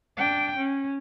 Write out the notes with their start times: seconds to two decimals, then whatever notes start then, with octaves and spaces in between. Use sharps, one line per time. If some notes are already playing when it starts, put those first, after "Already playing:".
0.17 D4 G5
0.57 C#4